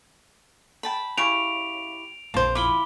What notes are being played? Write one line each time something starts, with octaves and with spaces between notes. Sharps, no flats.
G5 A5 B5
C#3 E4 G4 C#6 D7 F7
A#1 F2 A#3 C5 A5
E4 F4 B5 D6 G7